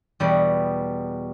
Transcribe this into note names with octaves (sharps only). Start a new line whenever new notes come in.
E2 B2 G3